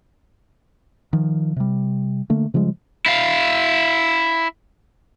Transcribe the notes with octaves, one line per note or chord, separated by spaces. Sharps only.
D#3 F3
C3 G3
D3 A3 A#3
C#3 F3 G3 G#3
E4 F5